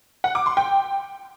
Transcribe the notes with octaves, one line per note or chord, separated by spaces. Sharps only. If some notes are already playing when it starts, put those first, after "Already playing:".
F#5
D6
C6
G5